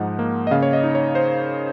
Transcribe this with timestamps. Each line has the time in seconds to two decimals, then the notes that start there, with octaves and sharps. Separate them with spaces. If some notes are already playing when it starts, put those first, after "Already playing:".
Already playing: G#2 F3 D#4 F#5
0.19 A#3
0.47 D#5
0.51 C#3 F5
0.63 C#5
0.73 D#5
0.83 D#4
0.95 C#5
1.15 C5